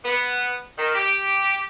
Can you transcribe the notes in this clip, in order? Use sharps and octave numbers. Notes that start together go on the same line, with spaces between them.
B3
D#3
G4